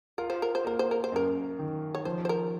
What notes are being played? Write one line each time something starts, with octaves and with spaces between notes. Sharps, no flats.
F4 A#4
C5
A#4
C5
A#3 A#4
C5
A#4
C5
F#2 A#4
D#3
C#5
F3 C5
C5
A#4